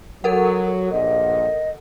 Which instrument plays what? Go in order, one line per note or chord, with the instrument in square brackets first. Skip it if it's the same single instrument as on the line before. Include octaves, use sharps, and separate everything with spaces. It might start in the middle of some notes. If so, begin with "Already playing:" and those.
[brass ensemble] F#3 [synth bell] A4 A#4 F#5
[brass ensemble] A#1 G2 A#2 [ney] D#5